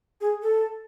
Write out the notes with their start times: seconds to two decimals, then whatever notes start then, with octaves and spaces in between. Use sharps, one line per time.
0.21 G#4
0.42 A4